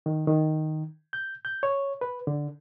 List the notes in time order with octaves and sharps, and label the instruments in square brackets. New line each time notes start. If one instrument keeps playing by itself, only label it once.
[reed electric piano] D#3
D#3
G6
G6
C#5
B4
D3